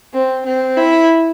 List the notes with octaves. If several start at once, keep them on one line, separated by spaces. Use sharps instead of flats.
C4
C4
E4